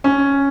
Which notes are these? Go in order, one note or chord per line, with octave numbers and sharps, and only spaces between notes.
C#4